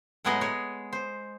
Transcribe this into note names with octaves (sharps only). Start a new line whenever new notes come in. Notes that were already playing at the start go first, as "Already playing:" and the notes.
A2 F#3 G#3 B3 G#4 D#5
G#3 C#5
C5